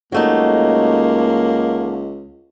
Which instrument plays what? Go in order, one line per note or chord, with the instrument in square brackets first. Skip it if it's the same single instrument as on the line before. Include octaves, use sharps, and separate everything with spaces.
[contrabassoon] C#2 [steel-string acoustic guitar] F#3 A3 D#4 [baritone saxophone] A#3